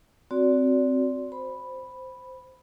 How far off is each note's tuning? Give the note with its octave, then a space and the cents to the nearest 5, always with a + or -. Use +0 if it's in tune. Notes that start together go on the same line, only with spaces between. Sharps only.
C4 +0 F#4 +0 D5 -30
C5 -5 B5 +0